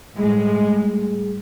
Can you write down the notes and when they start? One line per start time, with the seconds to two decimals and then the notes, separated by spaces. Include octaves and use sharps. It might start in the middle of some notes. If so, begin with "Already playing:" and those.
0.16 A2 G3 G#3 G#4